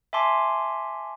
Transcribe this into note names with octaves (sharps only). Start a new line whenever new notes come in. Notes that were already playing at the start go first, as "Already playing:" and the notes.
E5 G#5 A5 C6 D6